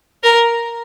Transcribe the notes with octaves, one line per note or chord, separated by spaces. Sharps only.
A#4